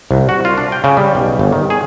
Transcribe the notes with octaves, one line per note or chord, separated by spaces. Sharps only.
C2
F#4
F4
D4
G5
C#3
G3
B1
G1
D#3
G#4